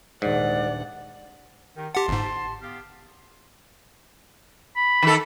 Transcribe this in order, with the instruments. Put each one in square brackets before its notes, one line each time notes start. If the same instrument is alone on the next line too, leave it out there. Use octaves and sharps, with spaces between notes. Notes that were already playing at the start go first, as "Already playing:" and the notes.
[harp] D#1 D4 [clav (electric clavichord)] G#2 [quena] D5 [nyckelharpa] F#5
[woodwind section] D#3 D#4 G4
[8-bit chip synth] G4 F#5 [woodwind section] A5 C6
[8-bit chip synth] G1 G#2
[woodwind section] B3 G4 F5
[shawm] B5
[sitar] D#3 A4